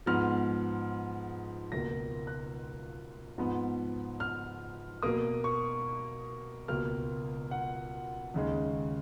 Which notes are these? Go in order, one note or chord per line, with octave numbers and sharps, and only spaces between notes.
G#2 F3 B3 F6
C#2 B2 A#3 A#6
F#6
G#2 F3 B3
F6
B2 A#3 D#6
C#6
C#2 B2 A#3 F6
F#5
D#2 C#3 G#3